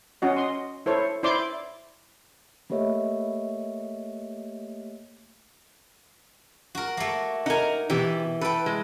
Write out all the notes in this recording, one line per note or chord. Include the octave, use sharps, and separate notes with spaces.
C#4 F#4 D#5
D#5 C6
E4 A4 C5 C#5
E4 C5 D5 C6 D6
A3 A#3 G4 C#5 D#5 E5
F#4 A#4
A3 A#3
D#4 A#4 F#5 G#5
B2 E3 G4
A4 B4 G5
G#3